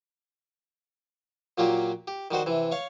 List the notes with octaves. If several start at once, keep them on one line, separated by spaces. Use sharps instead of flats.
A#2 F#3 A#3 F4 G4
G4
D#3 G3 F#4 C5
C3 E3
C#5 F5 C#6